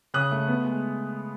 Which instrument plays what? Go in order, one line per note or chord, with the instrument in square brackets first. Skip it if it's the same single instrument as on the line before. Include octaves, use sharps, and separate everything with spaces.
[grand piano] C#3 D#6 F#6
A3
B3
G#3